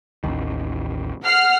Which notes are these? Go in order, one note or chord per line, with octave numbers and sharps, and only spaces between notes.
A1 D#2 D#3
F#5 F6 C7